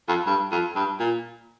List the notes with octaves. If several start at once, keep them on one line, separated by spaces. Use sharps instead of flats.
F2
G2
F2
G2
A#2